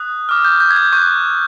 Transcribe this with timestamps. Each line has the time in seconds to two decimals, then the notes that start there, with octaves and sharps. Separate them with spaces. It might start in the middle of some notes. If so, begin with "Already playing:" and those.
Already playing: D#6 F#6
0.29 D6 F6
0.44 G6
0.60 G6
0.71 G#6
0.77 G6
0.93 C#6 F#6 G6